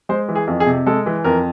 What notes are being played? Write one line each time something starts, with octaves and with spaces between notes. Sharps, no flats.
G#3 C5
E3
G#4
F2
G#4
C3
G#3 A4
E3
F2 A#4